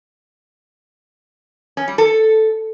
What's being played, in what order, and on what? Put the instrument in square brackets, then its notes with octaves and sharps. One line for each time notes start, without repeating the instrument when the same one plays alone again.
[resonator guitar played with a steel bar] C#4
G3
A4